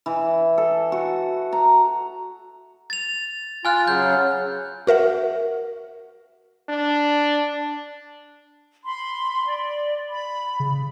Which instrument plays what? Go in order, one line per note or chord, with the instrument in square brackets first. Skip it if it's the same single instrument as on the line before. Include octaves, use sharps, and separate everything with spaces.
[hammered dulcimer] E3
A4
F#4
A#5
[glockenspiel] A6 F7
[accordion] F4 [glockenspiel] G#5 F6 F#6
[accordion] C#3 F#3 [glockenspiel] G6
[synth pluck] F#4 A#4 E5 F#5
[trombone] D4
[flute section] B5 C6
D5
B5
[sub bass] C#3